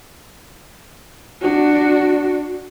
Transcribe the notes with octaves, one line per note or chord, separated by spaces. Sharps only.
D4 F#4